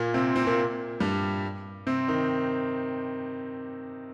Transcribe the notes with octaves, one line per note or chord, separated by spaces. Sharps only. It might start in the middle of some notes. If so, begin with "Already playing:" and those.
Already playing: A#2 A#3
C3 C4
C3 C4
A#2 A#3
G2 G3
C3 C4
D#3 D#4